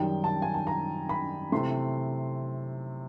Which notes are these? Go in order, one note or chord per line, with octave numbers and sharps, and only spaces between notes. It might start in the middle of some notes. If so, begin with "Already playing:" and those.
Already playing: F#2 D#3 G3 G5
A5
G#5
A5
A#5
B5
C3 E3 A3 C6